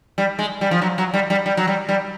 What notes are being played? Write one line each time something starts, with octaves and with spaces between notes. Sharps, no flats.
G3
G#3
G3
F3
F#3
F#3
G3
G3
G3
F#3
G3
G3